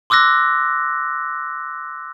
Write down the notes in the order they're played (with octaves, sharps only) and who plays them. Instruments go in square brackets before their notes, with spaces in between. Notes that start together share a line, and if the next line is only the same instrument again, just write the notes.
[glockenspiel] C6 D6 E6 F#6 A#6